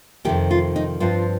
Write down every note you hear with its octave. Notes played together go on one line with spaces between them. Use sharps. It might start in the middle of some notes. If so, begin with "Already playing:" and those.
F2 C3 D#3 G4
F4
D#4
G2 F3 C4 F4